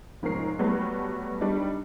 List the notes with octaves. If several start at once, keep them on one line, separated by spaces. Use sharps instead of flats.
F1 G#2 F3 C#4 A#4 C7
F#3 G3 A3 B3
G3 D4 D#4